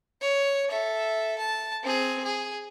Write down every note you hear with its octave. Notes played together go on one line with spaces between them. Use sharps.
C#5
A4 E5
A5
C4 G#4
G#4